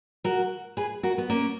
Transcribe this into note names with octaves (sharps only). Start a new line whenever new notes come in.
F#4 A#4
G#4 B4
F#4 A#4
B3
A#3 C#4